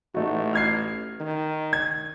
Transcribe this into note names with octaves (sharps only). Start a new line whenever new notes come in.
A1 A3 D#4 F#4
F6 G#6 C7
D#3
G#6